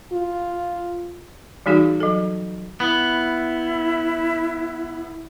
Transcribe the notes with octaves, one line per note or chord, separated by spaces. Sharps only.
F4
E3 G3 D#4 F#4 G#4
F#3 A4
B3 E4